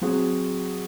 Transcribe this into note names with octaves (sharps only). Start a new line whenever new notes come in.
F#3 C4 F#4 G#4